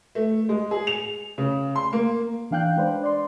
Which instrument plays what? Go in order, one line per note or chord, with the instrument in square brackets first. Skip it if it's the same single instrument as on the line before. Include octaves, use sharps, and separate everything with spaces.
[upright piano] A3
G#3
G#4
F7
C#3
C6
A#3
[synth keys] E3 D4 F5 G5 F#6 G6
G#3 D4 B4 C5
D5 C6